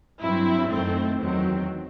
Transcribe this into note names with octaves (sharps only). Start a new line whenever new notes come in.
G2 F#3 C4 E4
F#2 D#3 A3 C4
E2 D#3 F#3 C4